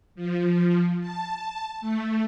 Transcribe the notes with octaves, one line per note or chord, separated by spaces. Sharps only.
F3
A5
A3